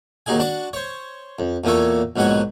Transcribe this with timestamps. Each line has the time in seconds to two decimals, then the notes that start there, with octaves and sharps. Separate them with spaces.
0.26 D#2 F#3 D#4 G#4 G#5
0.39 D4 F#4 A5 C#6
0.73 C5 C#5
1.39 F2
1.64 E2 A#2 A#3 A4 C#5
2.16 A#1 G#2 B2 F#3 F#5 G#5